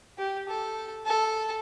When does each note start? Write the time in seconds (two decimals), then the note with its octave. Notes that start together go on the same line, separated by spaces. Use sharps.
0.18 G4
0.49 A4
1.06 A4